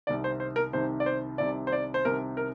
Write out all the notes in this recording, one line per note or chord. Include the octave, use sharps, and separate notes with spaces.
C2 C3 D#3 D5
C5
C5
A#4
C2 C3 D#3 C5
D5
C5
C2 C3 D#3 D5
C5
D5
C5
C2 C3 D#3 A#4
A#4